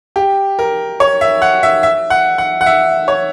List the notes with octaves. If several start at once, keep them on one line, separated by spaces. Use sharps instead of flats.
G4
A#4
C#5
E5
F#5
E5
E5
F#5
F#5
F#5
E5
C#5